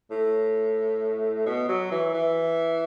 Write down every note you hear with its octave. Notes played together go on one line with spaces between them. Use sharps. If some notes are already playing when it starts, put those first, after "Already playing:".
A2
B2
F#3
E3
E3